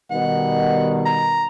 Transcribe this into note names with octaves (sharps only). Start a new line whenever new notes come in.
B2 D#3 G3 F#5
A#5